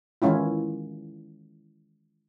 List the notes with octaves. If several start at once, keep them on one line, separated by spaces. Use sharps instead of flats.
D#3 E3 G#3 C#4 E4 F4